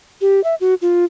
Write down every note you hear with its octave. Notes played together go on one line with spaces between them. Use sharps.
G4
E5
F#4
F4